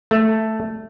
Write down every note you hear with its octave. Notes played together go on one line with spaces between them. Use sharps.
A3